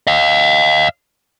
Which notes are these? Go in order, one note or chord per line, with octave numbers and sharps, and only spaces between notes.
D#5 F5